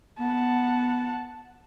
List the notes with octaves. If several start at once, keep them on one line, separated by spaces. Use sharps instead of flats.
B3 F#5 A5